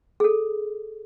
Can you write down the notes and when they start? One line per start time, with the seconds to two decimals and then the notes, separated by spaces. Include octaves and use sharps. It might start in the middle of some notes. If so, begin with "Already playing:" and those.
0.20 G#4 A4